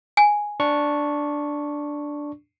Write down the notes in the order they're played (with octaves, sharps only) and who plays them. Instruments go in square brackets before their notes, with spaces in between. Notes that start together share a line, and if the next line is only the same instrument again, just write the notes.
[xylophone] G#5
[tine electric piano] D4 C#6